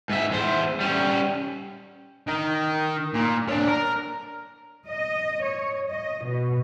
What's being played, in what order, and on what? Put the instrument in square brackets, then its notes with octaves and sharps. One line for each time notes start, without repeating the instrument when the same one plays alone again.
[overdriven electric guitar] G#2 E5
E2 C5
G3 C#4
[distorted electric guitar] D#3
A#2
D4 C#5
A#4
[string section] D#5
C#5
D#5
B2